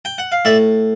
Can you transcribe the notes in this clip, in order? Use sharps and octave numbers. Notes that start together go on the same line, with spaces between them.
G5
F#5
F5
A2 D5 E5